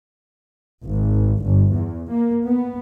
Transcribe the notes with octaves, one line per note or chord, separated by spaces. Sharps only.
G#1
G1
E2
A#3
B3